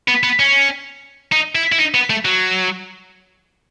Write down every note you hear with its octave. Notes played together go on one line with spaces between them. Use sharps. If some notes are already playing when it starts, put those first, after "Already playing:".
B3
B3
C#4
D#4
E4
E4
D#4
B3
A3
F#3